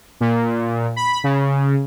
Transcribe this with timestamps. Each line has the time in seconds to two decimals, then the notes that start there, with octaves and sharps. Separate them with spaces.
0.21 A#2
0.96 B5
1.24 C#3